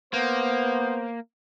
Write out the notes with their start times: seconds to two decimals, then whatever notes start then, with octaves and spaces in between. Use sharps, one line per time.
0.13 A#3 B3 C5